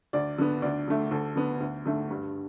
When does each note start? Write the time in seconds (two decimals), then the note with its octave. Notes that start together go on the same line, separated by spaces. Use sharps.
0.13 D2 D5
0.38 D3 B3
0.62 D2 D5
0.88 D3 A3
1.11 D2 A4
1.36 D3 B3
1.60 D2
1.86 D3 A3
2.10 G2